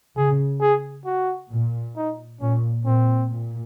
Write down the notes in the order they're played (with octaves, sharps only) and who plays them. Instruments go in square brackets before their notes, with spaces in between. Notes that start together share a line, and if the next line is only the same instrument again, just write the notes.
[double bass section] C#3 [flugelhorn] G#4
[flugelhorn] G#4
F#4
[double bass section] A#2
[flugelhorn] D#4
[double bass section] A#2 [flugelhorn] C#4
[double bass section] A#2 [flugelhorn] C4
[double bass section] A#2